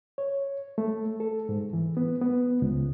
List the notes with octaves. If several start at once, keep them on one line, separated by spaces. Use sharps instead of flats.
C#5
A3
A4
G#2
E3
B3
B3
C#2